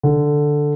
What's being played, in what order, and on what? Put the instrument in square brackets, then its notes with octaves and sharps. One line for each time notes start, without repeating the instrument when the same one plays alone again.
[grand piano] D3